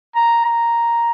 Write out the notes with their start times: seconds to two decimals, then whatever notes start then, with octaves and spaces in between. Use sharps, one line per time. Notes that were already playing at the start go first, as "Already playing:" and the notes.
0.15 A#5
0.45 A#5